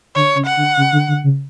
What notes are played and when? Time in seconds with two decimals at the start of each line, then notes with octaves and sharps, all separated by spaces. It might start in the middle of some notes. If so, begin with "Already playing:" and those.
0.15 D3 C#5
0.35 C#3
0.46 F#5
0.57 D3
0.77 C#3
0.92 D3
1.08 D3
1.24 C#3